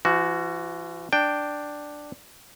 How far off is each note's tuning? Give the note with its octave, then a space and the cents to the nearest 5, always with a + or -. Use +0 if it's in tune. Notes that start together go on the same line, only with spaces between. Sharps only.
E3 +45 F#4 +0
D4 +5 G5 +0